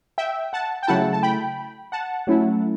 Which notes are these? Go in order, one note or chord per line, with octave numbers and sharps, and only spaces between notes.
E5 G5
F#5 A5
G5
C#3 F#3 A3 E4 F#5 A5
A5
G5 B5
F#5 A5
F#3 A3 C#4 E4